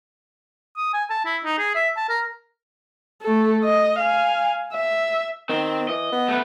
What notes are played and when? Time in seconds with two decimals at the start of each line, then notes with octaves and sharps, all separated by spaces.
0.77 D#6
0.94 G#5
1.10 A5
1.25 E4
1.45 D#4
1.58 G#4
1.75 E5
1.97 A5
2.09 A#4
3.22 A3 A4
3.64 D#5
3.99 F5 G#5
4.73 E5
5.49 D#3 C4
5.89 E3 D#5
6.12 B3
6.28 A3 B4